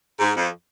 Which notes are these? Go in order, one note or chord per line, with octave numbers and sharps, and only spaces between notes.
G#2
F2